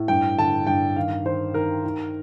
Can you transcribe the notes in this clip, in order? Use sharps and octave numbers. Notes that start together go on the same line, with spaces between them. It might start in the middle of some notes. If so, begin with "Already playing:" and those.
Already playing: A2
G2 G5
D3 A5
G2 G5
D#3 F5
D#3 C5
D#3 A#4
D#3